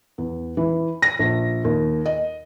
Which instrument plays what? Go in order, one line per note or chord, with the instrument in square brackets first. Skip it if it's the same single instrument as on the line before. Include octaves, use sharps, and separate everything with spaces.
[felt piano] E2
E3
A#6
A#1
D#2
D#5